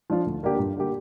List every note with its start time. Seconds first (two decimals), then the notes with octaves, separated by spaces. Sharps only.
0.10 F3 D4 F4
0.26 D2
0.43 D3 A#3 D4 G4
0.59 G2
0.76 D3 A#3 G4